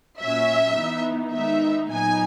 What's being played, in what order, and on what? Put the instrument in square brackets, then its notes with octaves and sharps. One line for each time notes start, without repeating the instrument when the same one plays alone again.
[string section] A#2 F#3 C#4 E5
E3 B3 D#4
D#3 G#3 B3 D#4 E5
A#2 F#3 B3 D#4 G#5